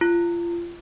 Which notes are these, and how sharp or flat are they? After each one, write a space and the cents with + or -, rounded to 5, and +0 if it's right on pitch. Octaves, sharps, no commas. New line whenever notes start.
F4 -30